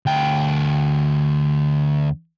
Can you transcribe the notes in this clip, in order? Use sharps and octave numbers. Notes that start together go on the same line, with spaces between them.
D2 G5